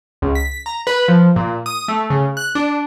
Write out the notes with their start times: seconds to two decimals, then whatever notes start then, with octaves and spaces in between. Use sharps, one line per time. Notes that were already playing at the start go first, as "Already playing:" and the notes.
0.22 C#2
0.35 B6
0.66 A#5
0.87 B4
1.08 F3
1.36 A#2
1.66 D#6
1.88 A3
2.10 C#3
2.37 F#6
2.55 D4